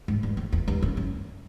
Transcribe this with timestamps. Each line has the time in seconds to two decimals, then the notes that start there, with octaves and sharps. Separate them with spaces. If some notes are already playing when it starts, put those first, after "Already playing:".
0.08 G#2
0.23 G2
0.37 F2
0.52 E2
0.68 G2
0.82 F#2
0.97 F#2